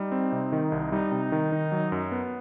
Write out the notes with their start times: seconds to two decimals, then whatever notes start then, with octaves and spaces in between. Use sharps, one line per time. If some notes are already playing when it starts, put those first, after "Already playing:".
Already playing: G3 D#4
0.12 C4
0.32 C3
0.52 D#3
0.72 C2
0.92 G3 D#4
1.12 C3
1.32 D#3
1.52 D#3
1.72 F#3
1.92 F#2
2.12 B3